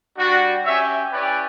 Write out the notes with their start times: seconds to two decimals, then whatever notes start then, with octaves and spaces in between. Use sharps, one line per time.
0.17 G3 D4 F#4
0.64 C#4 G4 C#5 E5
1.12 C#4 E4 G4 B4 D5